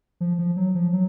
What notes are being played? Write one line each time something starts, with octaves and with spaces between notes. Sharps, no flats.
F3
F3
F#3
F3
F#3